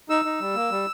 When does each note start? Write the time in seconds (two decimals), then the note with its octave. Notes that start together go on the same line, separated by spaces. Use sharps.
0.09 D#4 E6
0.25 D#4
0.41 G3
0.55 A#3
0.71 G3